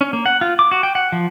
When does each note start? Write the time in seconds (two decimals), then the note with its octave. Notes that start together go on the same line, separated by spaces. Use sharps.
0.01 C#4
0.13 A#3
0.26 F#5
0.41 F4
0.59 D6
0.71 F#4
0.83 G5
0.95 F#5
1.12 F3